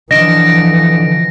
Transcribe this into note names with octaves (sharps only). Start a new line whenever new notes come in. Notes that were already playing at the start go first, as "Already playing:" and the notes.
D3 E3 F3 D#5 A#6 D7